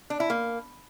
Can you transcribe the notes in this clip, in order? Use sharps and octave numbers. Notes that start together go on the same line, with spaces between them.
D4
E4
A#3